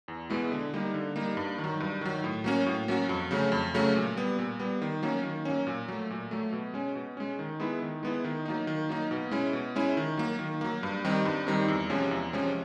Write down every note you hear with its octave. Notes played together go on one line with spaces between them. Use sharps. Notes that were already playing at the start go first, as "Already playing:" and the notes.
E2
B2 G#3 B3 E4
D3
G3 A#3 D#4
D3
G3 A#3 D#4
G2
D#3
F#3
G2
D#3 F#3
A2
F#3 A#3 C#4 F#4
A2
F#3 A#3 C#4 F#4
F2
C#3 F#3 A3 C#4
F2
C#3 F#3 A3 C#4
A#2
G3 B3
A#2
G3 B3
D#3
F#3 A#3 C#4
D#3
F#3 A#3 C#4
A#2
F#3 A3
A#2
F#3 A3
B2
G#3 C#4
B2
G#3 C#4
D#3
G#3 B3 E4
D#3
G#3 B3 E4
D#3
F#3 A#3 D#4
D#3
F#3 A#3 D#4
B2
G#3 C#4 E4
B2
G#3 C#4 E4
D#3
F#3 A#3
D#3
F#3 A#3
G2
D#3 G3 C4 D#4
G2
D#3 G3 C4 D#4
E2
C3 F3 G#3 C#4
E2
C3 F3 G#3 C#4